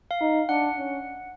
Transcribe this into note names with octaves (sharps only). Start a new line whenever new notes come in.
F5
D#4
D4 F#5
C#4